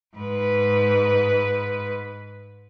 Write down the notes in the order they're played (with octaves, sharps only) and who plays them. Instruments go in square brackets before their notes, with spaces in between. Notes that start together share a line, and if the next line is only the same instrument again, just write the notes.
[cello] G#2 B4